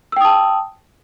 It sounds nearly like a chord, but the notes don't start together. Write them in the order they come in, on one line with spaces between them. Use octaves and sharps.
E6 G5 D#6 A5